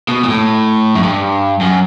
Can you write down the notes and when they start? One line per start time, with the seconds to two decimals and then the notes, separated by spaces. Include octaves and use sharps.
0.09 B2
0.24 A#2
0.28 A2
0.95 F#2
1.03 G2
1.61 F#2